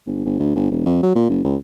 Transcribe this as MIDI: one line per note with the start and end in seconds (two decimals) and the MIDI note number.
0.06 0.21 31
0.25 0.35 31
0.39 0.53 38
0.55 0.71 31
0.71 0.83 28
0.86 1.02 41
1.03 1.15 54
1.15 1.28 46
1.29 1.40 30
1.45 1.56 37